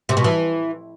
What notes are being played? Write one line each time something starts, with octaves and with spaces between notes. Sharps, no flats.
C3
B2
E3